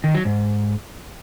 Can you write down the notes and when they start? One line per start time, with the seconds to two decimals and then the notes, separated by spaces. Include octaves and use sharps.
0.04 D#3
0.14 F#3
0.25 G#2